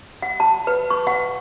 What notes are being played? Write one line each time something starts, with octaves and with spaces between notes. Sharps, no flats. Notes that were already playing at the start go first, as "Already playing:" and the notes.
F#5
A5
B4
C#6
F#5